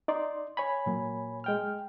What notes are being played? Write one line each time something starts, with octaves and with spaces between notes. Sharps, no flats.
D#4 D5 C6
C#5 G#5 B5
A#2 F#3 A#3
G#3 G5 F6